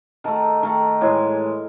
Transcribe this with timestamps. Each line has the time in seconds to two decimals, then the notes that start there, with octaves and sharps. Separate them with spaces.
0.24 D#3 A3 A5
0.63 D#3 A3
1.01 A2 E3 G#3 G#5